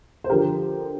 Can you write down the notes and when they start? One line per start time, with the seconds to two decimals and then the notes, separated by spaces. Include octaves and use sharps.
0.24 C5
0.29 D3 F3 G4 A#4